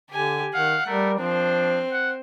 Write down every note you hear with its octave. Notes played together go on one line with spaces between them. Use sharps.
D3 G4 G#5
D#3 F5 F#5
G3 A3 A#4
F3 C4 D4 C5
F#5